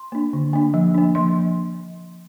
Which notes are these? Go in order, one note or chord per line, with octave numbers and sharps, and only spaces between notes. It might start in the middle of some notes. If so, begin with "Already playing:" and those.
Already playing: C6
A#3 D4
D3
A#3 D4
F3
A#3 D4
F3 C6